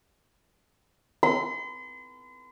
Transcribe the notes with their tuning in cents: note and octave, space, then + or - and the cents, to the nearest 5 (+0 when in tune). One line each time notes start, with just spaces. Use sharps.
C6 -40